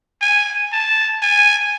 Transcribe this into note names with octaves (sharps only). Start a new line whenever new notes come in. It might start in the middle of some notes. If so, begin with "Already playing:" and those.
G#5
A5
G#5